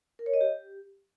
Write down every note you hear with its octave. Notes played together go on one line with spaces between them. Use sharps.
A#4
C#5
D#5
G4